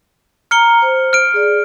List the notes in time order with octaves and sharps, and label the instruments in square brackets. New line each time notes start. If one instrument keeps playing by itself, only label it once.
[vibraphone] A#5 [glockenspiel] F6 C#7 G7
[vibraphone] C5
[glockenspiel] F6 D7
[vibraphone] G#4 D5